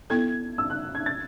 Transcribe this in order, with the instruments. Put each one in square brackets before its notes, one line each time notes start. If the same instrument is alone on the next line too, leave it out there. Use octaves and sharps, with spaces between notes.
[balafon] B3 E4 A4 [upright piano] G#6
[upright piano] E6
F#6
G#6
A6